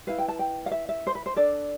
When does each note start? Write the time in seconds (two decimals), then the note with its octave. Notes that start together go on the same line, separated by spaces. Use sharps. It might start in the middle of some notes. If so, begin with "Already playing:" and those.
0.07 E4 B4 F5
0.18 G5
0.28 A5
0.39 G5
0.66 F5
0.71 E5
0.89 E5
1.07 C5
1.15 B4
1.26 C5
1.36 D4 A4 D5